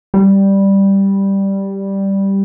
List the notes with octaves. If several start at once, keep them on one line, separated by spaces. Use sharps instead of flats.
G3